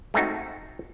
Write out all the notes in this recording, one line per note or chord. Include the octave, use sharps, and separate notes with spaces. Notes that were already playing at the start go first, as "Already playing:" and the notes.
G#3 A3 C4 D#4 F#4